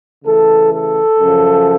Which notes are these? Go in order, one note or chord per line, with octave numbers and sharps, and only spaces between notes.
C#3 E3 A3 A4
A4
F#2 C#3 F3